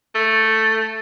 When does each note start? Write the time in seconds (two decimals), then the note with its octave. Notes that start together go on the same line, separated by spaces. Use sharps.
0.15 A3